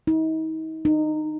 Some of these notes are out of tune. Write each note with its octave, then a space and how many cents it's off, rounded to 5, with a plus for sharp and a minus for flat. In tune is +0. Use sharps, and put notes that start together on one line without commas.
D#4 +40
D#4 -20